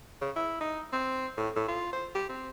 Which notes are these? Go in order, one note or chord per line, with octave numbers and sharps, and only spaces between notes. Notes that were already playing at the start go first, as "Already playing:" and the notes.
C#3
E4
D#4
C4
A2
A2
F4
C5
G4
C4